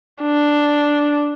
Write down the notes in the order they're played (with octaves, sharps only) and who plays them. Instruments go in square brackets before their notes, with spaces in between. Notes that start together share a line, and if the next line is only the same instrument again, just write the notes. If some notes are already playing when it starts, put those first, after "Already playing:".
[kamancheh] D4